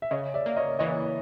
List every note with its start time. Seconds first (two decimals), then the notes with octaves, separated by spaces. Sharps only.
0.02 E5
0.11 C#3 C#5 D#5
0.34 D5 E5
0.46 A#3
0.56 C#5 D#5
0.79 E3 C#5 D#5